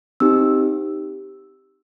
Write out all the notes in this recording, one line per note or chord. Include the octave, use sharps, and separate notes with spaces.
C4 D#4 G4 E6